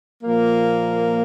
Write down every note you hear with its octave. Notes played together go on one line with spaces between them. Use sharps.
A#2 F3 A#3